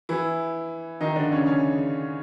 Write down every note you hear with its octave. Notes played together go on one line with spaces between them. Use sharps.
E3 E4
D#3 D#4
D3 D4
C#3 C#4
C#3 C#4